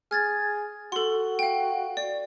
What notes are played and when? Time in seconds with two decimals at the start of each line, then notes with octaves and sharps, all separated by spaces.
0.11 G#4 F6 G#6 A6
0.92 F#4 A4 C6
1.39 F5 G5
1.97 D5